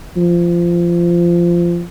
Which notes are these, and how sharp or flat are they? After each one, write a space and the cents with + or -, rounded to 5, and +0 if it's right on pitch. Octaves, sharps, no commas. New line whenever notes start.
F3 -20